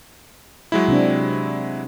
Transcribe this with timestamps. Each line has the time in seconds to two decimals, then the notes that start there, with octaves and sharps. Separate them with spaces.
0.72 F#3 G#3 E4
0.88 C3 C4 D4